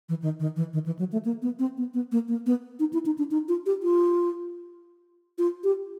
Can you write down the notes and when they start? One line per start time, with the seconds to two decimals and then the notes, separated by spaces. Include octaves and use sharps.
0.09 E3
0.22 D#3
0.40 D#3
0.56 E3
0.73 D#3
0.86 E3
0.99 F#3
1.12 A3
1.25 A#3
1.42 B3
1.59 C4
1.77 B3
1.94 B3
2.12 A#3
2.28 A#3
2.46 B3
2.79 D#4
2.93 E4
3.06 D#4
3.18 D4
3.31 D#4
3.48 F4
3.66 G4
3.83 F4
5.38 F4
5.64 G4